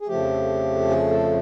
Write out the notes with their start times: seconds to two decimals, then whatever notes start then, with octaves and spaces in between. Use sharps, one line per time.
0.01 G#4
0.08 F2 C#3 F3 A3 G4
0.90 G#4
1.10 A4